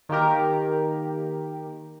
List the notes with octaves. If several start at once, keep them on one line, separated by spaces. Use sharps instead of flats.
D#3 A#3 G4 A#4